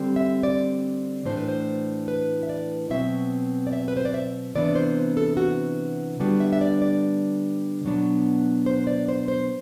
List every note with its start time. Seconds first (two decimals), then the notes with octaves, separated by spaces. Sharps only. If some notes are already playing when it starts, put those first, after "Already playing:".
Already playing: D3 G3 C4
0.16 E5
0.43 D5
1.26 A2 E3 A3 D4 C5
1.37 B4
1.48 C5
2.08 B4
2.43 E5
2.49 D5
2.90 B2 F#3 C4 E5
3.67 D5
3.73 E5
3.88 B4
3.97 C5
4.05 D5
4.14 E5
4.55 C3 E3 B3 D4 D5
4.75 C5
5.17 A4
5.37 F#4
6.20 D3 G3 B3 D4 F#4
6.40 E5
6.53 E5
6.61 D5
6.82 D5
7.85 B2 F#3 B3 D4
8.66 C5
8.87 D5
9.09 C5
9.28 C5